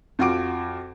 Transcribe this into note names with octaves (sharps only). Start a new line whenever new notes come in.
F2 F4 F#4 D6 D7